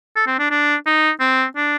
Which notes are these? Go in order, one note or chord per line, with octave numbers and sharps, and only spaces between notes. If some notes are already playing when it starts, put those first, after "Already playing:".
A4
C4
D4
D4
D#4
C4
D4